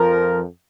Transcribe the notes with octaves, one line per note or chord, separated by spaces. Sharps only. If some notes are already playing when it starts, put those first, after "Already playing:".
Already playing: F2 F3 A#4